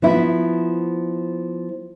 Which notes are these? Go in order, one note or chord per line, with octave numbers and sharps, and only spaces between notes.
F3 B3 E4